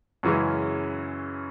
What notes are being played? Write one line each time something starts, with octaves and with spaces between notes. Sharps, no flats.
F#2 C#3 E3 G#3 C#4